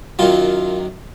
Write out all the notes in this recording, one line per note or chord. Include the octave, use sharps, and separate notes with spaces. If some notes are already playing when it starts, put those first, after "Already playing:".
F#2 D#3 F#3 F4